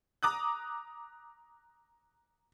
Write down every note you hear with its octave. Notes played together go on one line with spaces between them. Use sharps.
A#5 D6 D#6 F#6